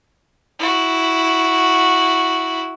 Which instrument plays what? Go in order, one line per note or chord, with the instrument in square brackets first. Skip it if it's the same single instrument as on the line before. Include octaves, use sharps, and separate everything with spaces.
[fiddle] E4 F#4